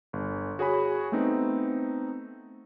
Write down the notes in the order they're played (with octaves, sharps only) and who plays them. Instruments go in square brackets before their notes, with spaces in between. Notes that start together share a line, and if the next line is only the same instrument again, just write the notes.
[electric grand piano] G1
F#4 G#4 C#5 G#5 B5
A3 B3 C4 D#4